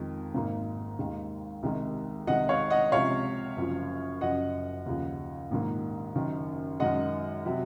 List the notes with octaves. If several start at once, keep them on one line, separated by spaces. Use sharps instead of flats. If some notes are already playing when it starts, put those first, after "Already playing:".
Already playing: F2 D#3 G#3
G#1 G#2 D#3 A#3
D#2 D#3 G#3
C2 C3 D#3 G#3
C2 C3 D#3 G#3 D#5 F#5
C#5 F5
D#5 F#5
C#2 C3 F3 G#3 C#5 F5
F#1 F#2 F3
F#1 F#2 F3 D#5 F#5
D#2 C#3 F3
A#1 G#2 D#3 A#3
F#1 F#2 D#3
F#2 D#3 G#3 D#5 F#5
C3 F#3